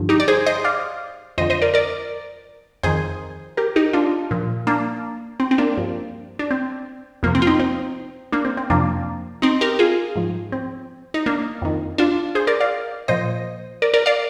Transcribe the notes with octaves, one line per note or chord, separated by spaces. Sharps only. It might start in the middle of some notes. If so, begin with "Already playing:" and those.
Already playing: G2 D3 F3
D#4 G4
D5
G#4 C5
C5 D#5
D5 F5
F2 D3 F3 C5 D#5
C5 D#5
A#4 D5
A#4 D5
F2 D#3 G#4 C5
G4 A#4
D#4 G4
D4 F4
A#2 F3
A#3 D4
C4
C4
A#3 D4
G2 F3
D4
C4
F2 C3 F3 A#3
C4
F4
C4 D#4
C4
A#3 D4
C4
C4
F2 C3 F3 A#3 D4
C4 D#4
G4 A#4
F4 G#4
G#2 F3
C4
D#4
A#3 D4
F2 D#3
D4 F4
G#4 C5
A#4 D5
D5 F5
A#2 F3 C5 D#5
A#4 D5
A#4 D5
D5 F5